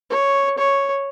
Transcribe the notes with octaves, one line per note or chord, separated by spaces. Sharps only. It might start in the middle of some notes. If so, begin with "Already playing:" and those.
C#5
C#5